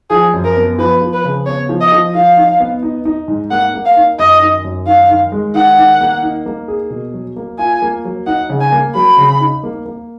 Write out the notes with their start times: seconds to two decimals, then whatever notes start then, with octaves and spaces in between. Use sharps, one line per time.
0.10 F3 G#4
0.34 F#2
0.44 A#4
0.56 B3
0.78 F3 B4
1.01 F3
1.13 B4
1.24 C#3
1.46 B3 C#5
1.69 F3
1.81 D#5
1.92 F3
2.14 F3 F5
2.37 D#4
2.60 B3
2.83 D#4
3.05 D#4
3.28 G#2
3.51 A#3 F#5
3.74 A#3
3.85 F5
3.97 D#4
4.19 F#2 D#5
4.42 D#3
4.65 F#2
4.87 D#3 F5
5.10 D#3
5.32 G#3
5.55 D#3 F#5
5.78 D#3
6.01 A#3
6.23 D#4
6.46 A#3
6.68 G#4
6.90 B2
7.13 F#3
7.36 A#3
7.58 F4 G#5
7.82 A#3
8.05 F#3
8.27 D#4 F#5
8.50 C#3
8.61 G#5
8.72 A#3
8.95 F#3 B5
9.18 C#3
9.40 D#4
9.63 A#3
9.86 A#3